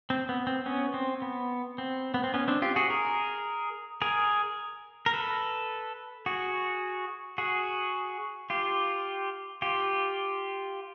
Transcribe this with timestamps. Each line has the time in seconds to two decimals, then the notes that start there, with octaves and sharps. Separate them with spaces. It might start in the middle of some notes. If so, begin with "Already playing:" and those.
0.10 C4
0.29 B3
0.47 C4
0.66 B3 C#4
0.94 C4
1.22 B3
1.78 C4
2.14 B3
2.24 C4
2.34 B3 C#4
2.48 C4 D4
2.62 F4 G4
2.76 F#4 G#4
2.90 G#4 A#4
4.02 G#4 A#4
5.06 A#4
5.14 A4 B4
6.26 F#4 G#4
7.38 F#4 G#4
8.50 F4 G4
9.62 F4 G4